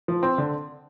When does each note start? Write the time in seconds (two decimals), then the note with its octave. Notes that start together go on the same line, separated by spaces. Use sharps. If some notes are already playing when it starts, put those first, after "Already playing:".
0.08 F3
0.23 C4
0.38 D3